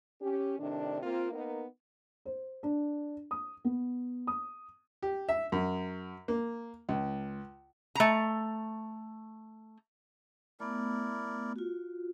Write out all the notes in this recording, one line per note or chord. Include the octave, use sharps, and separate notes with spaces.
C#4 G4
A2 C3 D#3 D4
A#3 C4 F4
A#3 B3 D#4 A#4
C5
D4
D#6
B3
D#6
G4
E5
F#2
A#3
C#2
A3 A#5
A3 B3 E4 A#4 D5
F4 F#4